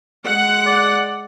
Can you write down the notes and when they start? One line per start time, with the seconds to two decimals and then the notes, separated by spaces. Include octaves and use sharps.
0.25 G#3 F#5
0.66 D5